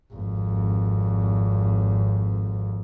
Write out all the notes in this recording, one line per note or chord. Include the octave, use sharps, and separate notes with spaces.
G#1 F2